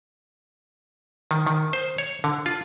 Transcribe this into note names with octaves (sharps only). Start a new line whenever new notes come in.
D#3
D#3
C5
C#5
D3
F4